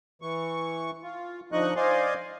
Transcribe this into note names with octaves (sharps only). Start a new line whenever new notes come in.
E3 C#6
F4
D3 F3 D#4 D#5 C#6 F#6
C5 D5 D#5 F5 G#5 C6